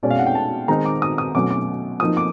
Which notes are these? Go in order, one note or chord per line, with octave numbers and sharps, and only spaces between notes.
B2 G#3 C#4 D5
F5
F#5
G5
A5
D#3 G#3 C4 D#4 A#5
D6
D#6
D#6
B2 F#3 A3 C#4 D6
D6
F3 A#3 D#4 D#6
D6